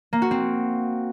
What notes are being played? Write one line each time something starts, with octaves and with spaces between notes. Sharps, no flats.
A#3
F#4
C4